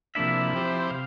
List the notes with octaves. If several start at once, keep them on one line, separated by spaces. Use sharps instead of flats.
C3 F3 A#3 D4 E4 E5
F3 C4 G4 C5
C3 F5